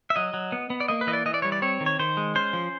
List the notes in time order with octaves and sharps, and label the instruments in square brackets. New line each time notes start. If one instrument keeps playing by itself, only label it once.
[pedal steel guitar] E5
F#3 D#5
F#3
B3
B3
D5
A#3 D#5
B4
E3 D#5
D5
E3 D#5
D5
G3 C#5
D5
C4 C#5
D#3
C#5
D#3 C5
G#3
C#4 C5
F3